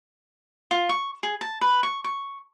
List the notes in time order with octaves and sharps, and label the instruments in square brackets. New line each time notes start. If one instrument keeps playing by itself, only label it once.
[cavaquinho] F4
C#6
G#4
A5
B4
C#6
C#6